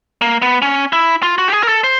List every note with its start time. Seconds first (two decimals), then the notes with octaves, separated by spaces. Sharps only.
0.22 A#3
0.42 B3
0.62 C#4
0.93 E4
1.23 F4
1.38 F#4
1.48 G4
1.53 G#4
1.63 A#4
1.68 A4
1.84 C5